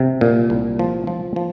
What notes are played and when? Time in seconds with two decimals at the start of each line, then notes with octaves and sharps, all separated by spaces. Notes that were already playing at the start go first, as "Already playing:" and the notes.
Already playing: C3
0.21 A#2
0.50 C2
0.79 F3
1.07 F3
1.36 F3